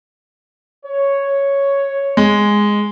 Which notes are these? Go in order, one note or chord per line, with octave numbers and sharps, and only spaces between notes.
C#5
G#3